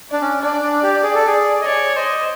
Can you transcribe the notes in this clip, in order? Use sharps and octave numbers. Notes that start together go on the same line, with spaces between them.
D4 D5
C#4
D4 D5
D4
G4
G#4
A4
G#4
D#5
C#5 D5
C5 D#5